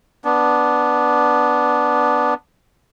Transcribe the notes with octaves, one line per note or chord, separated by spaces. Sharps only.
B3 D4